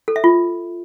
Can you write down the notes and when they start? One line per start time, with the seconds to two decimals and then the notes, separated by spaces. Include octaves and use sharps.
0.08 A4
0.16 E5
0.24 F4